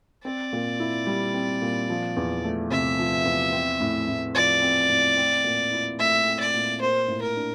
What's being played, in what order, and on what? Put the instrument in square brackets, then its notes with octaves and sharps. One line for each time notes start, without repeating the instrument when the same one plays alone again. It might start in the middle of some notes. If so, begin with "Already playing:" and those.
[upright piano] C4 [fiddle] D5
[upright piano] A#2
E4
G3
C4
A#2
F3
E2
A3
[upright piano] C3 [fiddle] E5
[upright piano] F3
E2
C4
A2
A2
[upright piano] F3 [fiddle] D5
[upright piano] C4
A2
C4
A#2
E4
[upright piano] A3 [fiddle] E5
[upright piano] C4
[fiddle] D5
[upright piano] A#2
[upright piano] A#3 [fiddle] C5
[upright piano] A2
[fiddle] A#4
[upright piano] D4